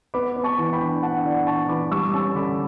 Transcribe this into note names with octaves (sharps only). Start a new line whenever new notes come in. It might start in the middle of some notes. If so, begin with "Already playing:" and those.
B3 B5 D6
B3
A5 C#6
E3
G5 B5
D4
D4 F#5 A5
E3 D5 F#5
E3 A5 C#6
E3 B5 D6
G3 C#6 E6
D6
C#4 A5 C#6
D3 B5 D6